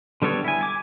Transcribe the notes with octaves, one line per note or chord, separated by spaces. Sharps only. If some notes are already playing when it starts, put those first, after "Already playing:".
D3 G3 B3 A4 C#5
E4 G#5
G#5 D6